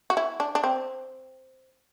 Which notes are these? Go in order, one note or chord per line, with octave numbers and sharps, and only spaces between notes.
F#4
E4
D4
D4
C4